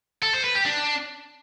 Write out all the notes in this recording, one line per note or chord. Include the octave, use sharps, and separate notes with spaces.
A4
C5
B4
G4
D4